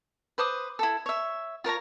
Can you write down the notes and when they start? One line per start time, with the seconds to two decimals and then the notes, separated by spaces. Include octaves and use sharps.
0.38 B4 C5 D6 D#6
0.79 E4 A4
1.06 C#5 E5
1.64 F4 A#4 C#5 A#5